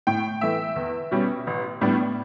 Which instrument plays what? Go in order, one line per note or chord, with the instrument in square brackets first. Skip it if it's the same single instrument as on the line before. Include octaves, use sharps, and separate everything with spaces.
[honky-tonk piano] A2 G5
E3 A3 E5
E2
B2 G3 C#4
A1
A2 G3 B3 D4